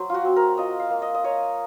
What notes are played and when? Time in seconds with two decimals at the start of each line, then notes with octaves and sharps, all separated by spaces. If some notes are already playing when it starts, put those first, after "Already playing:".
Already playing: F#3 C5
0.10 F4 F#4
0.25 C4
0.36 A#4
0.58 F4 D#5
0.79 F5
0.90 A#3
1.02 D#5
1.14 D#5
1.24 A#3 C#5